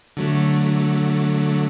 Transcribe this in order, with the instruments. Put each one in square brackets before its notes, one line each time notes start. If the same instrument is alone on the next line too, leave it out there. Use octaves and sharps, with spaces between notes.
[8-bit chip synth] D3 F#3 A3